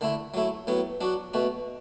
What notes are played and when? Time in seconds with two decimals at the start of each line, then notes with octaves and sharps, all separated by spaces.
0.01 D3 A3 E4
0.34 F#3 A3 E4
0.67 A2 F#3 B3
1.01 F#3 D4 F#4
1.34 B2 A3 F#4